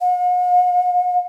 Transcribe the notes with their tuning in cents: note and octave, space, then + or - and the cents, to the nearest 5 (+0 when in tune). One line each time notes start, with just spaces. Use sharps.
F#5 -45